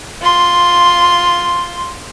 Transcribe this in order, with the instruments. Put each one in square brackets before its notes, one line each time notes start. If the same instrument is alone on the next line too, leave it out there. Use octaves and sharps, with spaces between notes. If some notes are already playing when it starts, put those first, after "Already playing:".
[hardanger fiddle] F4 C6